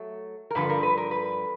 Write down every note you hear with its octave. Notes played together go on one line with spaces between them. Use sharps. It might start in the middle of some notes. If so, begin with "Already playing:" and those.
Already playing: F#3 A3
A#4
G2 D3 F3 B4
A#4
B4
A#4
B4